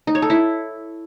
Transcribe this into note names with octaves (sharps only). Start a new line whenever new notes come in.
D#4
C#5
A4
E4